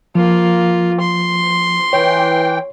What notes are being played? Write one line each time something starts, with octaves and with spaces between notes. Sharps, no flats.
F3 A#3 F4
C6
E3 C#5 G5